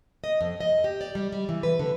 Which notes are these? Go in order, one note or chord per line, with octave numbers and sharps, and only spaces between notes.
D#5
F2
D#5
G4
D5
G3
G3
E3
B4
D3